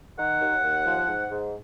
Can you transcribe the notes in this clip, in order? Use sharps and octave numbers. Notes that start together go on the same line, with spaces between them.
D#3 F#5
D#2
D#2
F3
G#2
G#2